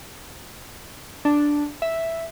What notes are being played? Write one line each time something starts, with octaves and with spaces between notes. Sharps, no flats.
D4
E5